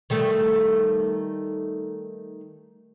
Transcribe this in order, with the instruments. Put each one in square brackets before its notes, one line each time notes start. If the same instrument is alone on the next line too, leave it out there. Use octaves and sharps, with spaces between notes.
[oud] D#3 G3 A3